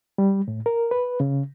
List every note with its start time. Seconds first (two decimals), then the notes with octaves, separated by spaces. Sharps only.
0.18 G3
0.48 A2
0.66 A#4
0.91 B4
1.20 C#3